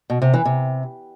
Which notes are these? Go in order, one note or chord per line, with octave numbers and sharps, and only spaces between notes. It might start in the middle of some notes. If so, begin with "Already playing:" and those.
B2
C3
E3
C3